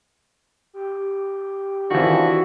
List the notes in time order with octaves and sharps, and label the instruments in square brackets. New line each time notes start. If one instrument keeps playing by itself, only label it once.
[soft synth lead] G4
[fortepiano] D#3 E3 [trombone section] C4 D4 F4 [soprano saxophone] F#4